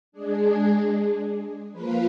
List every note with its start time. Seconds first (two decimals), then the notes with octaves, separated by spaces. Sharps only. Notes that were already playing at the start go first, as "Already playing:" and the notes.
0.12 G#3 D4 G#4
1.72 F3 A#3 F4 B4